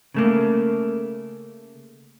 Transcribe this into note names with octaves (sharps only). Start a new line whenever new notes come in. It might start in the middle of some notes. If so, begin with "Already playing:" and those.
C#3 A3 A#3